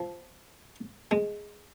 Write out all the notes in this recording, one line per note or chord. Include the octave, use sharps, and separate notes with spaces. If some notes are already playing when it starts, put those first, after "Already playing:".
Already playing: F3
G#3